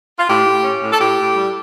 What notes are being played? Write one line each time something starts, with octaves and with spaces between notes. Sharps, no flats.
F4
A2 G4
A2
C#4
A2
A4
A2 G4
A2
G3